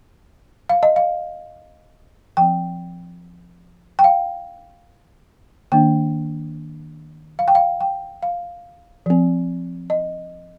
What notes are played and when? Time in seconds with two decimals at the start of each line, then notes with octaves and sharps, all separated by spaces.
0.69 F5
0.83 D#5
0.96 F5
2.37 F3 C4 G5
3.99 G5
4.04 F5
5.72 D#3 A#3 D4 G5
7.39 F5
7.48 G5
7.55 F5
7.81 G5
8.23 F5
9.06 F3 C4
9.90 D#5